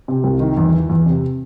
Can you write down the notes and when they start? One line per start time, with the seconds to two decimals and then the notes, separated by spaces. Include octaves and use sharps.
0.08 C3
0.24 C2
0.40 D#3
0.57 E2
0.73 E3
0.89 E2
1.06 C3